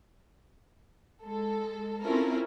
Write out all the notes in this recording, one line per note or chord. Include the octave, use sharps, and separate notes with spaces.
G#3 A4
C4 C#4 E4 F4 A4 A#4